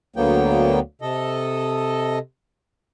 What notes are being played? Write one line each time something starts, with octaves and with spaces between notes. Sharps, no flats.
D2 D3 F#3 A#3 B3 G5
C3 A4 D#5